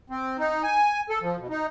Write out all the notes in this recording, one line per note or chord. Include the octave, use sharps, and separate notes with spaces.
C4
D#4
G#5
A4
F3
B2
D#4